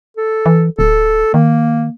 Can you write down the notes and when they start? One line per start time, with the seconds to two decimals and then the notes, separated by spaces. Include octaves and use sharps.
0.17 A4
0.46 E3
0.79 D1 A4
1.34 D#3 A#3